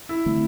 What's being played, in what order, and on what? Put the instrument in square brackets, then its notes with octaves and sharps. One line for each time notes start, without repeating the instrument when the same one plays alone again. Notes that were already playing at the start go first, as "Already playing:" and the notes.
[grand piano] E4
[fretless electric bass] D3 A3 C4